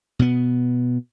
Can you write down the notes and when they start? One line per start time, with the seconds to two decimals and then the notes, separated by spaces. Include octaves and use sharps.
0.19 B2 B3